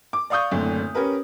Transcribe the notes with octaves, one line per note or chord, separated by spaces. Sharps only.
D6
D5 F5 C#6 D#6 G6
F#1 D2 A2 D3 C4
C#4 G4 A#4 B4